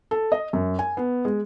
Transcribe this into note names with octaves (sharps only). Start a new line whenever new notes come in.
A4
D#5
F#2
G#5
B3
G#3